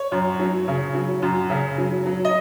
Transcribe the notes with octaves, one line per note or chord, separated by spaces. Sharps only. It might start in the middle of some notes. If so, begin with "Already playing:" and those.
Already playing: C#5
F#2
F#3
C#3
F#3
F#2
C#3
F#3
F#3
D#5